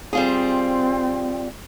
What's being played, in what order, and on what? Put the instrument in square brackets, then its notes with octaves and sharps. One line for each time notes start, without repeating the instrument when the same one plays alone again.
[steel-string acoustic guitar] G3 F4 G#4 [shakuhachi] C4